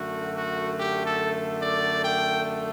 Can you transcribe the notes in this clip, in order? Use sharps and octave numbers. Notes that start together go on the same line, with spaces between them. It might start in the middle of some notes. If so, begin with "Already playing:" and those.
Already playing: F#2 D3 A3 F#4
F#4
G4
A4
D5
G5